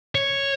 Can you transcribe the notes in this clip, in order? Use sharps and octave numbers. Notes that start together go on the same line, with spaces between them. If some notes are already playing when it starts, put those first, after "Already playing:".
C#5